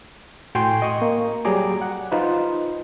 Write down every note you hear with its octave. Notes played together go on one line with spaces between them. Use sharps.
A2 F#4 G5 G#5 C6
D#5 C#6 D#6
A#3
F#3 G3 G#4 A#5 D6
F#5
D#4 F4 B4 C5